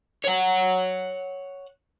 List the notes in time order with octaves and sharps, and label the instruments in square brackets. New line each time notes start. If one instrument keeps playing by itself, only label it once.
[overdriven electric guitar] C#5 F#5